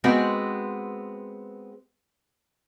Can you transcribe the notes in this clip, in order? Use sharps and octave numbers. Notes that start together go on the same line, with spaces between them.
G#3 B3 C4 F#4